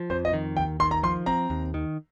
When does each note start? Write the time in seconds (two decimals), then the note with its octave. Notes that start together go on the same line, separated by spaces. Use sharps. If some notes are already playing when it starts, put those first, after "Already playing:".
Already playing: F3
0.10 F2 C5
0.25 D#5
0.33 D#3
0.57 D#2 G5
0.80 D#3 C6
0.91 A#5
1.03 F3 C6
1.26 C4 A#5
1.50 D#2
1.74 D#3